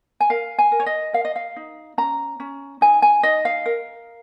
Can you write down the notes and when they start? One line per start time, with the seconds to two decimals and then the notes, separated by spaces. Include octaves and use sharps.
0.20 G#5
0.30 A#4 F5
0.59 G#5
0.72 A#4
0.80 C#5
0.86 D#5
1.13 A#4 F5
1.25 D#5
1.36 F5
1.56 D#4
1.98 C#4 A#5
2.40 C#4
2.81 D#4 G#5
3.02 G#5
3.23 D#4 D#5
3.45 F5
3.66 A#4